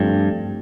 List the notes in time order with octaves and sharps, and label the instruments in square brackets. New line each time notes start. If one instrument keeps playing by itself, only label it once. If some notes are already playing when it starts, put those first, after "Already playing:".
Already playing: [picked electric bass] G2 [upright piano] F3 A3 C4 G4